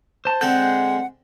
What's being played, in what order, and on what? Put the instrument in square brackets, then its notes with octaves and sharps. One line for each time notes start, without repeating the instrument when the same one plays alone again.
[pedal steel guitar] C5 A5
[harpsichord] D3 C4 A4 [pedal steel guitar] G#3 G6 [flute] F#5